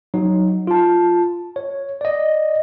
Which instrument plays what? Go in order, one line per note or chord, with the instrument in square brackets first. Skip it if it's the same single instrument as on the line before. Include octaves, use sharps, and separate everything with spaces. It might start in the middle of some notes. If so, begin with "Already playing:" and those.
[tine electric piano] F#3 D#4
F4 A5
C#5
D5 D#5